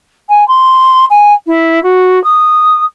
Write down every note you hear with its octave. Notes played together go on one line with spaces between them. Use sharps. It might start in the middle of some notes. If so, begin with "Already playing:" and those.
G#5
C6
G#5
E4
F#4
D#6